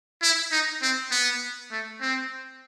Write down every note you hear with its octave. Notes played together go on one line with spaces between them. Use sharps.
E4
D#4
C4
B3
A3
C4